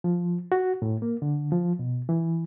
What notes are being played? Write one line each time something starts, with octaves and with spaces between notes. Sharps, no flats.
F3
F#4
A2
A#3
D3
F3
B2
E3